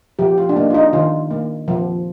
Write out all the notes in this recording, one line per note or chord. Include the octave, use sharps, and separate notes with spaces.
F3 G4
F4
D4
A#3 D#4
F4
D#4
D#3 F4
A#3
F3